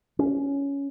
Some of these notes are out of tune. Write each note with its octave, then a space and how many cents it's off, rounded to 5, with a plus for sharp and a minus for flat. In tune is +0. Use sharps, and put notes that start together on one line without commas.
C#4 +10